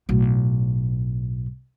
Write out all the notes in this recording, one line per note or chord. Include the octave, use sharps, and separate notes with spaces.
B1 A2